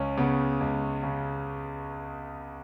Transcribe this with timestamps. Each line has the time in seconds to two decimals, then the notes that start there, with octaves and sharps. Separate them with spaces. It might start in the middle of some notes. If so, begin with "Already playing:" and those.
Already playing: C#2 C#4
0.17 C#3 B3
0.61 C#2
1.03 C#3